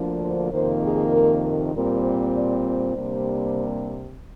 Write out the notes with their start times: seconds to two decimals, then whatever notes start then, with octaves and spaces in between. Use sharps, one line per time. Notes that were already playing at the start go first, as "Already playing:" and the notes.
Already playing: D2 D3 F3 A#3 D4
0.21 C5
0.51 F2 C3 D#3 A#3 C5
0.82 G#4
1.12 A#4
1.43 A#4
1.73 A#2 G3 C4 A#4
2.03 C5
2.34 D5
2.64 C5
2.95 C3 G3 A#3 D4